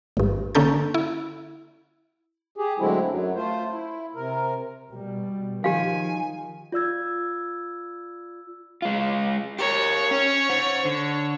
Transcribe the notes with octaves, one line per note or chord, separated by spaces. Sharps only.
G#1 G2
D3 A#3 C#4 A4 G6
E4
G4 G#4
D3 F#3 G#3 A3 C4 E4
F#2 F#3
A3 F4 C5
E4
C3 A#4
B2 G3
D#3 F3 G4 F5 G#5
F4 D5 E6 G#6
G#3 F4
G4 A#4 C#5
C#4
C5 F#5
D3